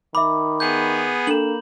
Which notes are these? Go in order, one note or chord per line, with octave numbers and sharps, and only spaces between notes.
D#3 E5 B5 D6
B3 G#4 G6
A#3 D4 A4 E7 F#7